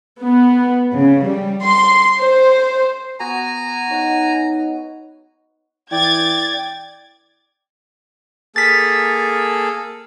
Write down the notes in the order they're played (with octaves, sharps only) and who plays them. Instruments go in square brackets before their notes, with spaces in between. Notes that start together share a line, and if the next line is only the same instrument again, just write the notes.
[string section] B3
C#3
G3
C6
C5
[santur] B3 F#4 [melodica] G#5 A#5
[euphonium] D#4 [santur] C#5 F#5
[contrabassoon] E3 [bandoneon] D5 G5 [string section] G#6 A6
[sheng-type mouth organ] A#3 G#4 A4 [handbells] A6 B6